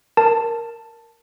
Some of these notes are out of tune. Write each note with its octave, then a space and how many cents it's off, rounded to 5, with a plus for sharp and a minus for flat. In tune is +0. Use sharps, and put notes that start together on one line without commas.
A#4 +0 A5 +10